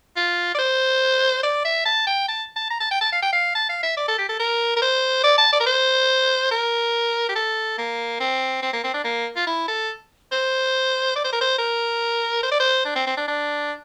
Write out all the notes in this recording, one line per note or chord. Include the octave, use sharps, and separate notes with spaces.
F4
D5
C5
D5
E5
A5
G5
A5
A5
A#5
A5
G5
A5
F5
G5
F5
A5
F5
E5
D5
A4
G4
A4
A#4
A#4
C5
D5
A5
D5
A#4
C5
A#4
G4
A4
A#3
C4
C4
A#3
C4
D4
A#3
F4
E4
A4
C5
D5
C5
A#4
C5
A#4
C5
D5
C5
D4
C4
C4
D4
D4